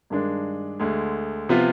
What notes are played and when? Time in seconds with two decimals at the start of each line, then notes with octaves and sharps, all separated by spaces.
0.10 G2 D#3 G#3 D4
0.80 D2 D3 G#3
1.49 C3 F3 B3 F4